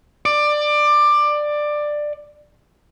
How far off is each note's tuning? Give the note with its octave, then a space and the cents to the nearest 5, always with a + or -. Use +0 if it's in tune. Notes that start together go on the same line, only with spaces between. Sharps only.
D5 +15